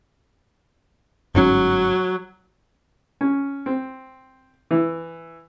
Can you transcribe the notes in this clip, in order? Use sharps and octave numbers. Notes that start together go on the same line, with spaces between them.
G1 G#2 F#3 C#4
C#4
C4
E3